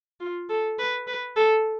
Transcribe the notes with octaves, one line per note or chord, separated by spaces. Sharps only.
F4
A4
B4
B4
A4